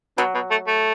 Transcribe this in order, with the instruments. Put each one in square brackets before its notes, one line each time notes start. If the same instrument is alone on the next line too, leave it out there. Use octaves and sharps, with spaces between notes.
[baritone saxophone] B2 [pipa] F#3
[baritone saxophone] B2
A3
A3